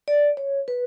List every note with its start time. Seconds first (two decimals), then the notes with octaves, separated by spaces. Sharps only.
0.08 D5
0.37 C#5
0.68 B4